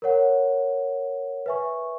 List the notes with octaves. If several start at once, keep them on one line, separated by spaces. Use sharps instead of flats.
A#4 C#5 F#5
B4 E5 G#5 C#6